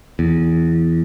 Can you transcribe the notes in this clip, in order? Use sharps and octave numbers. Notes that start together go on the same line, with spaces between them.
E2